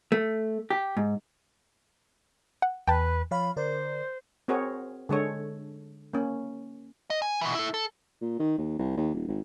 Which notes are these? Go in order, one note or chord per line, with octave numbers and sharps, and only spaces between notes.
A3
G4
G#2
F#5
E2 B4 G5 A5
F3 C#5 F5 B5
D3 A#4 C5 D5
C4 F#4 G#4 A#4 C#5
D3 G#3 A4 C#5
A#3 C#4
D#5
G#5
B2 E3
E4 A4
A4
A#2
D#3
D#2
C2
D#2
D#1
G#1